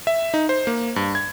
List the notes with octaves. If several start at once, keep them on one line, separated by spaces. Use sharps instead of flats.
E5
D#4
C5
A#3
G2
G#6